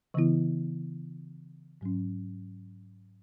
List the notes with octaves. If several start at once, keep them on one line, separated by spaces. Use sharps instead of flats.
C#3 E3 B3 E4
G#2 F#3 C#4